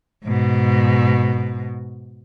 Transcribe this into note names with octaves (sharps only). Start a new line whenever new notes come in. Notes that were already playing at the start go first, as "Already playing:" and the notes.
G#2 B2